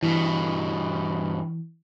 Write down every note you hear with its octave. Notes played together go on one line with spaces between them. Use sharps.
G2 B2 E3